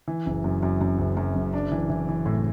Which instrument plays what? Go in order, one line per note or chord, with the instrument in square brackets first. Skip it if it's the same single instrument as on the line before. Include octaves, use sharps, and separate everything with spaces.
[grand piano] E3
F#1
F#2
F#2
F#2
F#1
F#2
F#1
D4
E3
E3
E3
A2